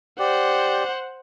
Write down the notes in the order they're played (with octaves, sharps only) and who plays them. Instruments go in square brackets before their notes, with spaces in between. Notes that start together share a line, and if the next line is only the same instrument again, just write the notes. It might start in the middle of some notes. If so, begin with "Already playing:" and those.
[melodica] G4 D5 [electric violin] C5 F#5